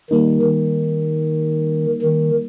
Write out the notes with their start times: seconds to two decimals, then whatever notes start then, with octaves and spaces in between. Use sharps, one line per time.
0.10 D#3 G3 A#3 D#4
0.42 D#3
2.02 D#3